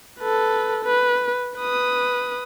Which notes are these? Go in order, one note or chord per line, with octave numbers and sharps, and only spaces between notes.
A4 B4
B4
B4 D#6